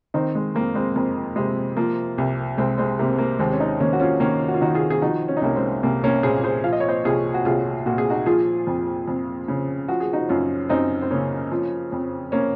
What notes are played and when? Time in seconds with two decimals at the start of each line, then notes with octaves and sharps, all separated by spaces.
0.14 D#3 C4 D#4
0.35 G#3
0.55 F2 A#3
0.75 G#3 C4
0.96 F2 A#3
1.36 C3 G#3
1.77 F3 A#3
2.18 C2
2.58 C2 G#3 C4
2.78 G#3 C4
2.99 C3 A#3
3.18 A#3
3.39 D#2 G#3 C4
3.53 C#4
3.60 C4 D#4
3.80 D#2 A#3 C#4
3.93 F#4
4.00 C#4 F4
4.20 D#3 A#3 C#4
4.48 F#4
4.54 F4
4.61 D#3 D#4 F#4
4.74 F4 G#4
4.90 G#4
5.01 F3 D#4 F#4
5.28 C#4
5.37 D#4
5.42 C2 A#3 C#4
5.56 G#3 C4
5.83 C2 A#3
6.04 A#3 C#4
6.23 A#2 G#4 C5
6.44 G#4 C5
6.64 F3 F5
6.73 D#5
6.80 C#5
6.88 C5 D#5
7.04 C2 F4 G#4
7.34 F#4
7.45 C2 F4 G#4
7.86 A#2 F#4
7.98 G#4
8.10 D#4 F#4
8.26 F3 F4 G#4
8.67 F2
9.08 F2
9.48 C#3
9.88 F3 F#4
10.00 G#4
10.13 D#4 F#4
10.29 F#2 C#4 F4
10.69 F#2 C4 D#4
11.02 C4
11.11 C#3 A#3 C#4
11.52 F3
11.92 F2
12.32 A#3 C#4